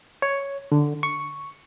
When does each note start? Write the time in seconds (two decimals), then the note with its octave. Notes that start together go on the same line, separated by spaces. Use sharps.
0.22 C#5
0.72 D3
1.03 C#6